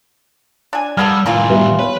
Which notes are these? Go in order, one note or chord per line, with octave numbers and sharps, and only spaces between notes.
D4 G#5
G3 A#3 B3 A4 F6 G#6
A2 D#3 E3 A#3 F4
G3 B3 E5
B4 C#5